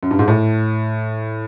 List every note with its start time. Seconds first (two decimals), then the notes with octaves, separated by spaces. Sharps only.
0.03 F#2
0.11 G2
0.19 G#2
0.28 A2